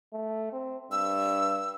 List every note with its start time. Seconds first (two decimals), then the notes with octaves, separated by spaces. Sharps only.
0.14 A3
0.53 C4
0.92 G2 E6